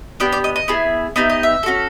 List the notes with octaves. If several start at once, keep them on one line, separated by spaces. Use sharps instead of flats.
B3 D4 G4 D5
D5
D#5
D#5
B3 E4 G#4
B3 D#4 G4 E5
D#5
E5
C#4 F#4 A4